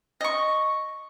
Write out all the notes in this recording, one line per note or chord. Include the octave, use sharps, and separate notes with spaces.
D#5 C#6